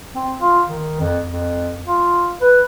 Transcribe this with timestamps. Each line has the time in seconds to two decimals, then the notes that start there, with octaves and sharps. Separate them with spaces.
0.16 C4
0.41 F4
0.67 D#3
1.00 F2
1.25 F2
1.87 F4
2.41 B4